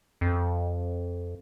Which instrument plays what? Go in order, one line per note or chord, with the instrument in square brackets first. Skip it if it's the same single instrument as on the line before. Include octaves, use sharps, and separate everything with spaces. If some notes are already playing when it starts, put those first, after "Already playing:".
[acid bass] F2